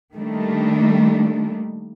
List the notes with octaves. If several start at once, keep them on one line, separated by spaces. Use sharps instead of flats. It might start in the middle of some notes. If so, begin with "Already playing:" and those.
D#3 G3 A3 A#3 D4